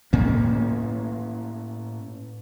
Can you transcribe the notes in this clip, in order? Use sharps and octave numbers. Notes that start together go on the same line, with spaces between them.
A2 A#3 C#4